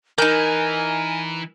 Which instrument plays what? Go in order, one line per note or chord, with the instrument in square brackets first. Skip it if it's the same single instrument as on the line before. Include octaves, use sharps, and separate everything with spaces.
[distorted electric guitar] E3 [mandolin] D#4 G6 [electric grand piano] A#4 [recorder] G#5